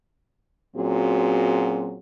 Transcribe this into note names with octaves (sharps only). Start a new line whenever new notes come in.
A#2 F#3 C4 C#4 F#4 G#4